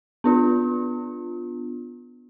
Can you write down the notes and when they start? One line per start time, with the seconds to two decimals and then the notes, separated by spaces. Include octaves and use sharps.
0.24 B3 D4 F4